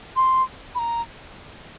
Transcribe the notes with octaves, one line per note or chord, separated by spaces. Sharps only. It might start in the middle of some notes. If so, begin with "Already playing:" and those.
C6
B5
A#5